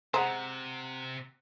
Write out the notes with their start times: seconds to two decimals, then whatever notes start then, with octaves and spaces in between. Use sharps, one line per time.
0.14 C3 G#3 C5 F#5 A#5